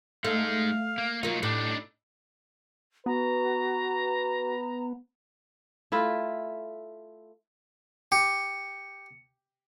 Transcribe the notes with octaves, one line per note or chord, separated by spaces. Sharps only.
G#3 A3 D#4 F5
A#3
F#3 A#3 D#4 F4
A2 D4 D#4 G4
B3 F#4 B4 A#5
A3 E4 F4
G4 C#7